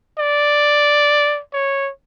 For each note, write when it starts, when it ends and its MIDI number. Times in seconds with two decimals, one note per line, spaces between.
0.18 1.40 74
1.53 1.90 73